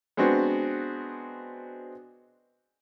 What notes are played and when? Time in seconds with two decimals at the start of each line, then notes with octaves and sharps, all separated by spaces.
0.17 G#3 B3 C4 D4 F#4